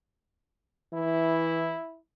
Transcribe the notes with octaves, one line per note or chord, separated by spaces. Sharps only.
E3 E4